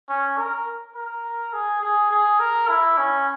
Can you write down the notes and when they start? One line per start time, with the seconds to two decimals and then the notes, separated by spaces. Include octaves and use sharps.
0.09 C#4
0.37 A#4
0.95 A#4
1.53 G#4
1.82 G#4
2.11 G#4
2.40 A#4
2.69 E4
2.98 C#4